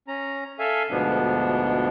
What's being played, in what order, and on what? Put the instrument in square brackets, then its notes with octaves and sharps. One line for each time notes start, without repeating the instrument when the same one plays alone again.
[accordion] C#4 A#5
A4 E5 F5 G#5
D2 G#2 B2 F3 B3 D4